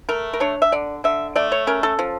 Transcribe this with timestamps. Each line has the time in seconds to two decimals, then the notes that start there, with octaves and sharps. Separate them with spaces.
0.09 A3 A#4
0.33 A#4
0.40 D4 C#5
0.62 E5
0.72 D3 D5
1.04 D3 E5
1.36 A3 D5
1.52 C#5
1.67 C#4 A#4
1.83 A4
1.99 F3